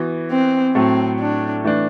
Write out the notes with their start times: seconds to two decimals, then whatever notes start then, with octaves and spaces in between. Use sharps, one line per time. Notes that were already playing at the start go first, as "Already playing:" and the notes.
Already playing: E3 B3 F#4
0.31 C4
0.75 A2 F#3 A3 C4
1.20 D4
1.64 E3 A3 D4